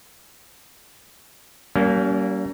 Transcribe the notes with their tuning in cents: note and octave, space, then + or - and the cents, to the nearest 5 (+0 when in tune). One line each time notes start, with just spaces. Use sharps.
G3 -35 A#3 +0 C#4 +30